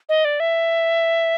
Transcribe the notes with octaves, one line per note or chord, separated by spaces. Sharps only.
D#5
D5
E5